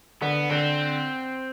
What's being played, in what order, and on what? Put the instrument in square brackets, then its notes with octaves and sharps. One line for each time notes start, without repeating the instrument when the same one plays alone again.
[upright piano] D3 [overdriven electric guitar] B3
[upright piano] D3 [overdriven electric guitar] C4